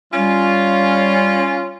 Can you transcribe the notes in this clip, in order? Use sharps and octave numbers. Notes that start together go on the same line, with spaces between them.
G3 C#4 F4